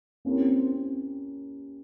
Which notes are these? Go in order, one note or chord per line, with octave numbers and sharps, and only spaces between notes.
A#3 C4 C#4 E4 G4 A#4